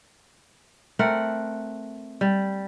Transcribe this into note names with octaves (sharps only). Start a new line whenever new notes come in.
A3 C4 A#4 F#5
G3